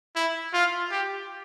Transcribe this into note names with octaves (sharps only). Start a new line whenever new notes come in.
E4
F4
G4